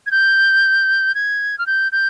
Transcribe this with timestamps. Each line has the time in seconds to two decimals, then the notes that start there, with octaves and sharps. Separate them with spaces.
0.06 G#6
0.11 G6
1.15 G#6
1.58 F6
1.67 G6
1.92 G6